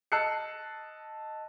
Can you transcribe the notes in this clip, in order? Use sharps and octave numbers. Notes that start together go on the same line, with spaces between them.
D#5 A5 E6 F#6 C7 C#7